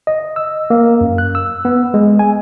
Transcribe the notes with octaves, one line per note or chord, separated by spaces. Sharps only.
D#5
E6
A#3
F#2
F#6
E6
B3
G#3
G#5